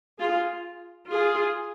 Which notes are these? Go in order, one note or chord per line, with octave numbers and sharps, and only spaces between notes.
F4 G#4
F4 G#4